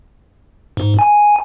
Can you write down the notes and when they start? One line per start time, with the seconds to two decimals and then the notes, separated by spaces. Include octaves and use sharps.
0.77 G#2
0.99 G#5